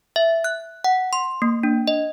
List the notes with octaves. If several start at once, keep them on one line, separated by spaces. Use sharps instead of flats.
E5
F#6
F#5
C6
A#3
D4
D#5